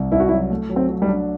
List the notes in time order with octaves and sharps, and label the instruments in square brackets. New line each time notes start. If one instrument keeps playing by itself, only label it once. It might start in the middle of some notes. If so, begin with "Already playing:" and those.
Already playing: [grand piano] C2 C3
[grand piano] C2 [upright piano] E4
[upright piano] F#4
E4
[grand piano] F#3
A3
F#3
[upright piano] C4
[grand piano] F#3
[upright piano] G3
[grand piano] D4